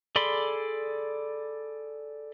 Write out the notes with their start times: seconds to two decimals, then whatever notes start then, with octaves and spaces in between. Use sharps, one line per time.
0.16 G#4 A4 D5 B5 C6